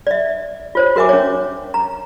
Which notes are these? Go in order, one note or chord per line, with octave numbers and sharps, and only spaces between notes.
D5 E5
F4 C5 C#5
F#4 A#4 E5 G#5 D6
C#4 C#5
A#5